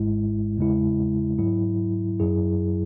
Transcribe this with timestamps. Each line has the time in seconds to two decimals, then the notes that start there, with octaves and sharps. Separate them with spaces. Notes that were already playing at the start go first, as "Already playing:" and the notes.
Already playing: G#1 G#2 G#3 E4
0.57 E2 C#3 G#3 E4
1.39 G#2 F#3 E4
2.20 F#2 F#3 E4 G#4